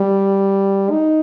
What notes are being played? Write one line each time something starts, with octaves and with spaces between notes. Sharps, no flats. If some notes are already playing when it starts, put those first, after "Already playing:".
Already playing: G3
D#4